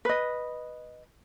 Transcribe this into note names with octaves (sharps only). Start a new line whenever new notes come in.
B4 D#5